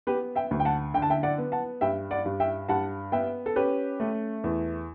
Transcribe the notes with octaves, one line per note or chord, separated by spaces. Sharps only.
B3 G4 B4
E5 G5
D2
G5
F#5 A5
D3 G5
A5
E5 G5
D5 F#5
B3
F#5 A5
G2 E5 G5
D5 F#5
G2
E5 G5
G2 F#5 A5
B3 E5 G5
A4
C#4 G4 B4
A3
E2